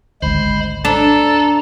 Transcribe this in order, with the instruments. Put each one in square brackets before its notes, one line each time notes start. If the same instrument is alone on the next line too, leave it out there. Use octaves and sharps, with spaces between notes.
[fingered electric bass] G#1 D2 [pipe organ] G#3 B5 [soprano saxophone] C5
[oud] D4 [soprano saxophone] A4 [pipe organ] A#5